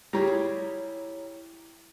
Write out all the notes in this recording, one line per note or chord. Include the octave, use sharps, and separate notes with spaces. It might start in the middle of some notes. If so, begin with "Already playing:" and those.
G3 F4 G4 G#4 C#5 A#5
E4